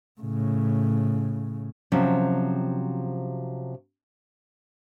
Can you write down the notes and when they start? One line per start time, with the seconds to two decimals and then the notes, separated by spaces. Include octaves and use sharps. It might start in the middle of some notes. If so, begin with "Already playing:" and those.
0.21 A2 C#3
1.92 C3 F3 F#3 C#4